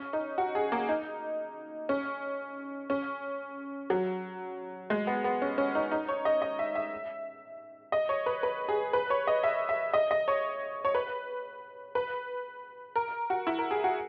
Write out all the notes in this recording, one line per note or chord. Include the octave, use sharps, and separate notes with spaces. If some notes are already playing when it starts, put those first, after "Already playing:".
Already playing: C#4
D#4
F#4
G#4
A#3
D#4
C#4
C#4
F#3
G#3
B3
B3
C#4
C#4
D#4
D#4
C#5
D#5
D#5
E5
E5
D#5
C#5
B4
B4
G#4
B4
C#5
D#5
E5
E5
D#5
D#5
C#5
C#5
B4
B4
A#4
F#4
E4
A#4
G#4
F#4